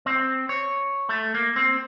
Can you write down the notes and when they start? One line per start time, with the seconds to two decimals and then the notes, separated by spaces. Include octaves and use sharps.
0.06 C4
0.49 C#5
1.09 A3
1.35 A#3
1.56 C4